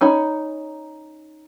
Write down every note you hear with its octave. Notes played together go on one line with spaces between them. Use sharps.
C#4 D#4 C#5 B5